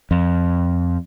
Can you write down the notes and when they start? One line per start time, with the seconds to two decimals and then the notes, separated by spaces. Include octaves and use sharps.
0.11 F2